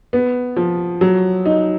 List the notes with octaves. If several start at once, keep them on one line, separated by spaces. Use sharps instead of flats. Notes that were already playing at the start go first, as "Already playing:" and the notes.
B3
F3
F#3
D#4